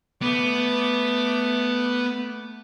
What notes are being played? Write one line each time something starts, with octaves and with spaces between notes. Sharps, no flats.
A3 B3 D6